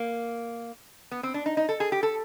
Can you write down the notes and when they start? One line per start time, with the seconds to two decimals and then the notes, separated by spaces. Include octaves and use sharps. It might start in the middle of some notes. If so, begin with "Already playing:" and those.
Already playing: A#3
1.11 B3
1.23 C4
1.34 D4
1.46 D#4
1.57 D#4
1.69 A4
1.80 G#4
1.92 G4
2.03 A4